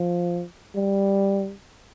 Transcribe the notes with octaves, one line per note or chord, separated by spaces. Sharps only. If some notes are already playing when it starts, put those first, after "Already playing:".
Already playing: F3
G3